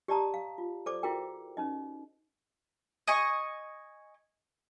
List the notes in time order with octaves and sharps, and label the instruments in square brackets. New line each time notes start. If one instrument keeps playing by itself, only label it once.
[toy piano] G4 D5 D#5 A5 A#5 D#6
F5
F4
A4 C5 D5 D6
E4 F#4 G#4 A#4 G5
C#4 D#4 D#5
[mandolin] D#5 G#5 C#6